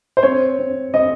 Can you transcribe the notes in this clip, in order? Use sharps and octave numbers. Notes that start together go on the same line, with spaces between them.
C5
C4 C#5
C4
C4 D#5